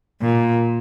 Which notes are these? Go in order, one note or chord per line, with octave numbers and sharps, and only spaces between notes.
A#2